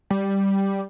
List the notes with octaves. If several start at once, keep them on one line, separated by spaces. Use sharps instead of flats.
G3